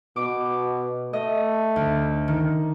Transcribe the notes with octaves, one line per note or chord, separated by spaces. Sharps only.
B2 D6
A3 D#5
D2
D#3